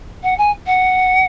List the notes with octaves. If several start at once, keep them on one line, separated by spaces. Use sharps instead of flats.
F#5
G#5
F#5